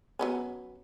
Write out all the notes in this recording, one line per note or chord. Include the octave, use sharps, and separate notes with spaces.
F#3 B3 C#4